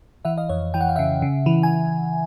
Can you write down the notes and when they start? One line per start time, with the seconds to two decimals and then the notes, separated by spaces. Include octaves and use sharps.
0.25 E3 E5 F#5
0.37 D#5 F5
0.49 F2 C#5 D#5
0.74 E3 G5
0.81 F#5
0.89 F5
0.96 C#3 E5 F#5
1.22 C#3
1.46 E3
1.63 G#5